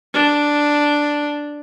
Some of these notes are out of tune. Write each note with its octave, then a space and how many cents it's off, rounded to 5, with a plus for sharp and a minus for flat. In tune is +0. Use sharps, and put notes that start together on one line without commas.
D4 +0